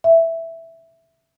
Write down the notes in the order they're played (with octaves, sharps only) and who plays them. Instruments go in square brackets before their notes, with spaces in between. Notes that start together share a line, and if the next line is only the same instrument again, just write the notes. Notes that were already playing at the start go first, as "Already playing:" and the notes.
[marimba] E5